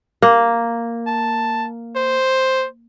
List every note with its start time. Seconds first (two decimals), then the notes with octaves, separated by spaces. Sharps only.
0.22 A#3
1.07 A5
1.96 C5